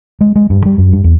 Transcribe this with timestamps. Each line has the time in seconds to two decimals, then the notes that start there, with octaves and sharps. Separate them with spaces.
0.21 G#3
0.36 G#3
0.50 G2
0.66 G3
0.78 F#2
0.93 G2
1.04 E2